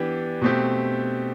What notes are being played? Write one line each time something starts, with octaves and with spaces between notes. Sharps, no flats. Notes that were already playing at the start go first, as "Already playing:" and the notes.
Already playing: E3 B3 D4 G4
B2 A3 C4 G4